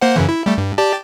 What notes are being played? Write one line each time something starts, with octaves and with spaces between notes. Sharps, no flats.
A#3 C5 F#5
F#2 C#3 E3
E4
G3 A3
G2
G4 D5 A5